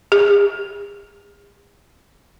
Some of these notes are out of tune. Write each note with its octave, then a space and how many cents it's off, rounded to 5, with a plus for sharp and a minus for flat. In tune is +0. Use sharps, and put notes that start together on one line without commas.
G#4 -45